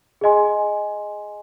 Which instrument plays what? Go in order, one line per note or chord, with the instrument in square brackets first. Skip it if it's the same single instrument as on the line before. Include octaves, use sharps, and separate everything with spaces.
[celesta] G#4 D#5 G#5 C6